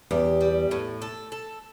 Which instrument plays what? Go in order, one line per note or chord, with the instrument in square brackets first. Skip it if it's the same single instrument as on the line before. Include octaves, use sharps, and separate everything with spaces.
[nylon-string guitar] E2 [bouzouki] G4
[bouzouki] G3
A2
A4
A4